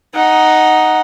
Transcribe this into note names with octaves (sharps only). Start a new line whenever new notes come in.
D#4 F#5